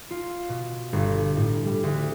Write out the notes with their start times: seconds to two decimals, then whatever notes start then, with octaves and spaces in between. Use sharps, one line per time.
0.11 F4
0.49 B2
0.93 G1
1.37 A2
1.65 G3
1.84 D2